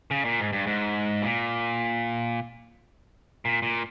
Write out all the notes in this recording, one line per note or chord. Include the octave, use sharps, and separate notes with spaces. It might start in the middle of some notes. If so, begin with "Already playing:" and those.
C#3
A#2
G#2
G2
G#2
A#2
A#2
A#2